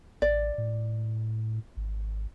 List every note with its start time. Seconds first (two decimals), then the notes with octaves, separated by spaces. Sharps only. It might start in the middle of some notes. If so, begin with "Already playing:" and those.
0.22 A1 D5
0.58 A2
1.77 G#1